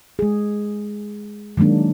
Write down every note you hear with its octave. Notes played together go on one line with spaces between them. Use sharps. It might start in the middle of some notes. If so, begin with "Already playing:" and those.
G#3 G#4
D#3 F#3 G#3 A#3 D4